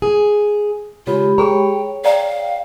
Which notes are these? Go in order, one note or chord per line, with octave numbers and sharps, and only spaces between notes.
G#4
C#3 G#3 F4 G4 B5
G#4 C#5 G5 A#5
D5 F5 G5 A#5